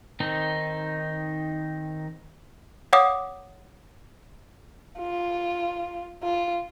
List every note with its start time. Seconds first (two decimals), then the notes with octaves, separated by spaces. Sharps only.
0.20 D#3 C4 D#4
2.93 C#5 F5 F#5 D6 D#6
4.98 F4
6.23 F4